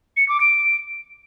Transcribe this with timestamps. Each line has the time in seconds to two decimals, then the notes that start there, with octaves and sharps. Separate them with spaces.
0.17 C#7
0.29 D6
0.41 D7